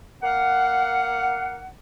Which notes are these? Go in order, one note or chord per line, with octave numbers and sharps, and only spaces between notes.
A#3 F5 F#5